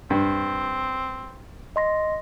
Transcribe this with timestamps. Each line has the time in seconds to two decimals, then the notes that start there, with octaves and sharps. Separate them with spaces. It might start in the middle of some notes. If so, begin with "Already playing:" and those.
0.10 G2 C4
1.76 D#5 C6 A#6